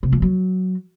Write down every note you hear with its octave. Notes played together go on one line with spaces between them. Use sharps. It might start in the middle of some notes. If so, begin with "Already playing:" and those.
C3
F3
F#3